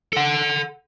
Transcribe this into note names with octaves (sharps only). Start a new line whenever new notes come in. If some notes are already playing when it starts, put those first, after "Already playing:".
A4 F#5